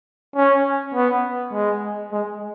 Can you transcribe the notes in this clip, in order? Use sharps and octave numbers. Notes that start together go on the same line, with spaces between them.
C#4
B3
G#3
G#3